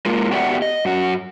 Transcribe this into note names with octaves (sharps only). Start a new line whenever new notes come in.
G#3 A#3 F4
B3 F#4 G4 D5 E5 F#5
D#5
F#2 F#4